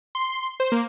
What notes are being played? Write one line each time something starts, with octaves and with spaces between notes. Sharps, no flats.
C6
C5
A#3